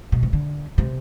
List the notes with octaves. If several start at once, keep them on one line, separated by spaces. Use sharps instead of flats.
B2
C3
D3
C3